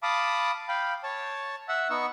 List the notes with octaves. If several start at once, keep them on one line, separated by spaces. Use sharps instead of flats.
F5 A5 B5 D6 D#6
F5 G5 B5
C#5 A5
E5 F#5 E6
B3 D#4 C#6 E6